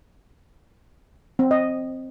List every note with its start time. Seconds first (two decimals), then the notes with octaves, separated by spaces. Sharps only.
1.39 C4
1.51 D#5